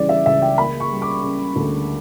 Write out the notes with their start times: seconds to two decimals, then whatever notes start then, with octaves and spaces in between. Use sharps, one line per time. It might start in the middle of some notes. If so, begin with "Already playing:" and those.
Already playing: C#3 E3 G3 D5
0.09 E5
0.26 C#2 E5
0.42 G5
0.58 A#3 B5
0.80 C#6
0.90 G3
1.02 D6
1.23 C#3
1.56 D2